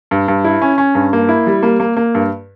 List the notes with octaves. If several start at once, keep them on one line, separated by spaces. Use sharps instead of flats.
G2
G2
E4
C#4
C#4
G2
A#3
E4
G3
A#3
A#3
A#3
G2